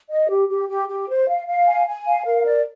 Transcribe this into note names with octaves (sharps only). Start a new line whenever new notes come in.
D#5
G4
G4
G4
G4
C5
F5
F5
G#5
G#5
F5
A#4
D5